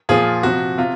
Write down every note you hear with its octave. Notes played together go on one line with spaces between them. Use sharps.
A#2 F3 F4 G#4
C3 F3 F#4
C3 F4